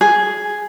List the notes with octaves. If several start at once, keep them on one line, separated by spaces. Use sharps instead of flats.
G#4